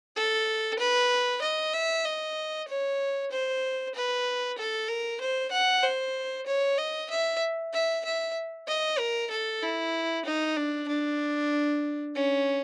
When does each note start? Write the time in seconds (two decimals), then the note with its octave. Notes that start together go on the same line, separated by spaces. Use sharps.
0.16 A4
0.79 B4
1.42 D#5
1.73 E5
2.05 D#5
2.68 C#5
3.31 C5
3.95 B4
4.58 A4
4.88 A#4
5.21 C5
5.52 F#5
5.83 C5
6.47 C#5
6.78 D#5
7.10 E5
7.73 E5
8.05 E5
8.68 D#5
8.99 A#4
9.31 A4
9.62 E4
10.25 D#4
10.57 D4
10.88 D4
12.15 C#4